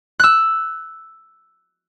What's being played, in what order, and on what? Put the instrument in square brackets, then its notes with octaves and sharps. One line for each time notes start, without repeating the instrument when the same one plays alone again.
[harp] E6 F#6